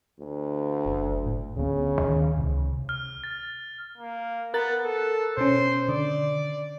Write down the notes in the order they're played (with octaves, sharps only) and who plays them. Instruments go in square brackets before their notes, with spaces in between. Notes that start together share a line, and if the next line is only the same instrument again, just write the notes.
[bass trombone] D2
[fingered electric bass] F#1
A2
[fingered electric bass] D2 B3 [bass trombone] C#3
[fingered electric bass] D#2 A2 D#3
C#2 C3
[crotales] F6
A6
[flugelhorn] A#3
[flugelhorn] B3 [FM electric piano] A#4 F#6 A6
[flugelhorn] A4
[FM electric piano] B2 C#4 [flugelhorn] C5
[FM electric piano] D3 [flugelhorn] D5